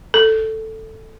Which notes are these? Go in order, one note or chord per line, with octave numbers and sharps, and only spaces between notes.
A4